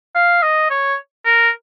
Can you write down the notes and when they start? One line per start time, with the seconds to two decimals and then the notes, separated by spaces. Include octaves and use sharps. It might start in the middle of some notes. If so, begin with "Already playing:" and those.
0.16 F5
0.42 D#5
0.71 C#5
1.25 A#4